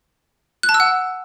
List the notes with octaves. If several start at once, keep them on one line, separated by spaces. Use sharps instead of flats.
F#6
A5
E6
F#5